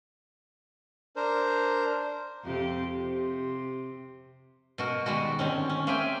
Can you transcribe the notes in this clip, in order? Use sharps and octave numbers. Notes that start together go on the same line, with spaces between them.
D4 A#4 C5
F2 C3 G4
C3
B2 F#4 A#4
D#3 G3 G#3 F#4
D3 D#3 C4 C#4
C#4
A#3 C4 G#4 E5 G5 G#5